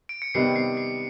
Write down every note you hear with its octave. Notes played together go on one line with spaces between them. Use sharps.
D7
C#7
C3 D#3 G3 B3 D#4 C7
C7
C7